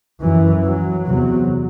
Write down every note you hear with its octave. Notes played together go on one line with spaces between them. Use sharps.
F#2 E3
F#3
E2 C3 F#3